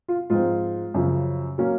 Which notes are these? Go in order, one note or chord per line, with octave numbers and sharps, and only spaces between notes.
F4
G#2 F3 C4 F4
F#2 C#3 F3
F#3 A#3 C#4